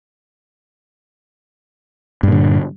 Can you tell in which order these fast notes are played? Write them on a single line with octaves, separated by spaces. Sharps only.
G2 A#2 D3